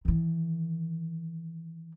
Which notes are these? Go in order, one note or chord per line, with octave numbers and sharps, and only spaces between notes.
D#3 E3